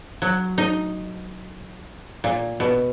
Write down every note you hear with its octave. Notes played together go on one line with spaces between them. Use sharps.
F#3
D#4
A#2
B2